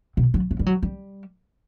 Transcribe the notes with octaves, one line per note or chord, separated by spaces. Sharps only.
B2
F#3
F#3
G3
F#3
G3